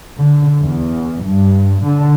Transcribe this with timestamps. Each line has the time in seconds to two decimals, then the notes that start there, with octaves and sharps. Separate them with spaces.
0.19 D3
0.61 E2
1.25 G2
1.83 D3